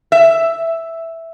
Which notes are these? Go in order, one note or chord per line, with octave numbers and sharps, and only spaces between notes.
E5